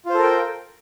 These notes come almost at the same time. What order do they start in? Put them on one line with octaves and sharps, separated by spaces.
F4 C5 A4 A#4 G5